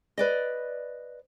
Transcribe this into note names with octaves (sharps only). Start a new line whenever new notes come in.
B4 D5 D#5